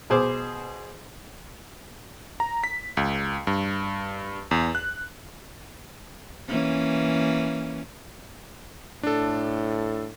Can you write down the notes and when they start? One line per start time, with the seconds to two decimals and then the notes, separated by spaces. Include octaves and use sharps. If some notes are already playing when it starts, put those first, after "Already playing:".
0.10 B2 G#4 C5 D6
2.40 A#5
2.64 B6
2.97 C#2
3.47 G2
4.51 E2
4.75 F#6
6.48 E3 A#3 C#4
9.03 A2 D4 A4